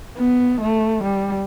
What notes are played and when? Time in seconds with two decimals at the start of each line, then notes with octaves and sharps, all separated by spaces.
0.18 B3
0.60 A3
1.03 G3